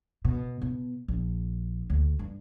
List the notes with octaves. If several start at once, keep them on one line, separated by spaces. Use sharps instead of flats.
B2
B2
A#1
D2
G2